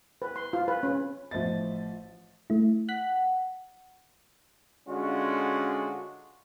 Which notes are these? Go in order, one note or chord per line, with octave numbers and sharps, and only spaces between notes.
B4
C6
F4
B4
C#4
A1 F3 C5 D#5 E5 A6
A3 E4
F#5 F#6 B6
D3 G#3 C#4 D4 F4 F#4